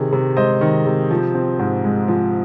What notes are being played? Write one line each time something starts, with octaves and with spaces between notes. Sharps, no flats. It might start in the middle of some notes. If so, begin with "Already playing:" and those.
Already playing: C3 D#3 G#4
C3
G#3 C5 D#5
D#3
C3
F3
C4
G#2
G#3
F3